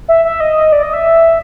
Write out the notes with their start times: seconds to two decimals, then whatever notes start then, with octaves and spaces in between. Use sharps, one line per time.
0.08 E5
0.25 E5
0.40 D#5
0.72 D5
0.83 D#5
0.93 E5